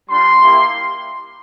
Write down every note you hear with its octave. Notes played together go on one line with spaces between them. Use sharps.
G3 D4 F4 C6
A#3 E4 G4